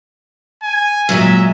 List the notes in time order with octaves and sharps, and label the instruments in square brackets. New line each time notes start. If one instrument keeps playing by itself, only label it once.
[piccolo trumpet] G#5
[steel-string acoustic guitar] A#2 F#3 G#3 [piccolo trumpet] E5